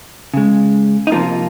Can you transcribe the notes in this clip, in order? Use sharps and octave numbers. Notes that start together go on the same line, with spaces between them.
C#3 G#3
D#4
C3 F3 A#3 F4